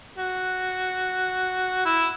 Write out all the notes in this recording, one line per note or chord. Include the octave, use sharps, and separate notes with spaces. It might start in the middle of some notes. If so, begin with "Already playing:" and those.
F#4
E4